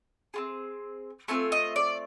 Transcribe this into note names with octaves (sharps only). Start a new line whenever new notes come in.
C4 F4 G#4
A3 C4 F4 G#5
D#5
D5